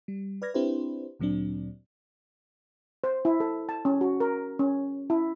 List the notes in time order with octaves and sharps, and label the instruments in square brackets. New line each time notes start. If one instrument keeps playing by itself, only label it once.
[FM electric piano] G3
B4 D5 F6 G#6 A#6
C4 D4 E4 G4 B4 C5
D2 A#2 F#3 C4 D4
[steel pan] C5
E4
A4
A5
C#4
F#4
A#4
C#4
E4